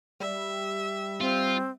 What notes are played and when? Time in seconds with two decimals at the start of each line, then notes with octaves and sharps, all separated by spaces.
0.20 G3 E5
1.20 C4 F4